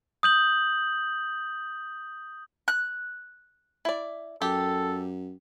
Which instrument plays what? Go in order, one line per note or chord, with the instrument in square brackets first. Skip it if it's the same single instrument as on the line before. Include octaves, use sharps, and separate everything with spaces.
[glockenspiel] D#6 G6 F#7
[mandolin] F#6
[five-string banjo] E4 D5
[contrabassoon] F#2 [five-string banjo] G4 [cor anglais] A4